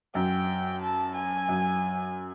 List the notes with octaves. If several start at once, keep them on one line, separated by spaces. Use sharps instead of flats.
F#2 G5
A5
G#5
F#2